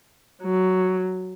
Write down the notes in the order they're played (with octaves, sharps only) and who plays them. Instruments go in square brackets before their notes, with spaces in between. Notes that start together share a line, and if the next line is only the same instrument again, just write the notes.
[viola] F#3